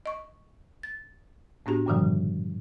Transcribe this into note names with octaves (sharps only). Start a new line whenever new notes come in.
D#5 C#6
A6
A2 B3 D4 F#4 G4
G2 A#2 D3 D#3 F3 G3